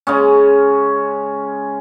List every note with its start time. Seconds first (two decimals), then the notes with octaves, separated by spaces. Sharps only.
0.07 C#3 G#3 C#4